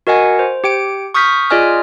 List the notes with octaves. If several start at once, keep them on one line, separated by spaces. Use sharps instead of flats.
F#4 A#4 D#5 F#5 G#5
C5
G4 G5 D7
C#6 D#6 F6 G6 B6
F4 G#4 D5 D#5 G#5 F6